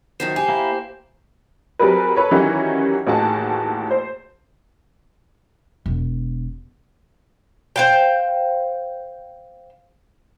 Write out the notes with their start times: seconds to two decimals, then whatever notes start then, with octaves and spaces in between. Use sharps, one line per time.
0.20 F#2 D#3 F3 C5
0.36 G4 G#5
0.48 A#3 E4
1.79 F#3 G3 C4 G#4 A#4 B4
2.16 A4 B4 C#5
2.31 D#3 E3 F#3 G3 C#4 F#4
3.07 A1 D#2 F#4 G#4 A5
3.91 C5
5.86 E1
7.76 C5 F5 G5